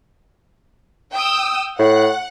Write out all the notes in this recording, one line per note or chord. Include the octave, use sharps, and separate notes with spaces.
G5 D#6 E6
A2 F#5